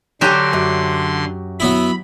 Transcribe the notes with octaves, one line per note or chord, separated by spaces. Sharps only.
D3 F#3 F#4 G4 G5 G#5 C6
F#2
F#3 B3 E4 B5